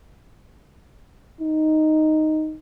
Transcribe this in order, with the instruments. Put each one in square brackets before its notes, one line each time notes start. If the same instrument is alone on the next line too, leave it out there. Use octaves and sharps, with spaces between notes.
[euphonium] D#4